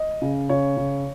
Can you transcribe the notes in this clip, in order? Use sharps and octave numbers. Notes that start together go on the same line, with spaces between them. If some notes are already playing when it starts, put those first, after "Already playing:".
Already playing: D#5
C#3
C#3 C#5
C#3